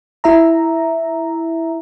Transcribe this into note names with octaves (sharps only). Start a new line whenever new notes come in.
E4 E5 A#5